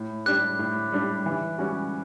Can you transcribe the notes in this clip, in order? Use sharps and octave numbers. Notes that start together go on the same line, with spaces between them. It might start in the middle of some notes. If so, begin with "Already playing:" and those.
Already playing: A2
G3 D4 G4 F#6
A2
G3 D4 G4
E3
G3 C#4 F#4